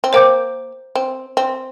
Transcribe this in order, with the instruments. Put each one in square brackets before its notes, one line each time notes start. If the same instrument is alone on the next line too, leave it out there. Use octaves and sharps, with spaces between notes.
[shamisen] C4
[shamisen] A#3 [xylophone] C5 G5 D6 G6
[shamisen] C4
C4